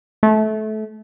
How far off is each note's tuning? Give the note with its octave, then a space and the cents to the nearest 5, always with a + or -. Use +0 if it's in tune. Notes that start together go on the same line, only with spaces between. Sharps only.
A3 -25